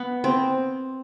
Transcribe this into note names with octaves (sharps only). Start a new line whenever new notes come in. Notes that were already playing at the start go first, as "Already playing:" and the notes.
Already playing: B3
C4